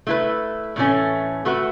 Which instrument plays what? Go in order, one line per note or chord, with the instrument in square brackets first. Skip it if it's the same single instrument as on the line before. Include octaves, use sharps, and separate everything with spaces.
[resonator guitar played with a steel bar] A3 E4 B4
A2 E3 A3 C#4
A3 F#4 B4